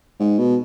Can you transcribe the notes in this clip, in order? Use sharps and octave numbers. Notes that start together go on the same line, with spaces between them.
G#2
B2